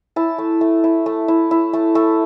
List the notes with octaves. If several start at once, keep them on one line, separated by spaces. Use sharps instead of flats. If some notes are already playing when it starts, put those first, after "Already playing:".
E4 A5
A3
A3
E4
A3
E4
E4
A3
A3